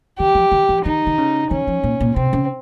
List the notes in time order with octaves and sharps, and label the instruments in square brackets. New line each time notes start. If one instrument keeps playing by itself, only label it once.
[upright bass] D#3 [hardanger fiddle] G4
[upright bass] F3
D#3
F3
[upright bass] D#3 [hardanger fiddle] D#4
[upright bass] D#3
C#3
[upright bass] D#3 [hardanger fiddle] C#4
[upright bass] F3
A#2
A#2
[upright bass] C3 [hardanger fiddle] C4
[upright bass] C#3